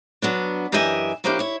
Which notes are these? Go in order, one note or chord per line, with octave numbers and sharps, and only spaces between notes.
F#3 B3 D4
F#2 E3 G4 D#5 E5 G#5
F3 A#3 C#4 D4 E4 G4
E4 C#5